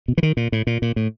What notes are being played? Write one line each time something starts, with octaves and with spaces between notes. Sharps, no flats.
B2
E3
D#3
A#2
A2
A#2
A#2
A2